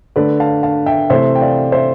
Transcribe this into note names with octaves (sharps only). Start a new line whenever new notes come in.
D3 A3 B4 D5
F5 A5
F5 A5
E5 G5
C3 E3 A3 C5 E5
G5
D5 F5
C5 E5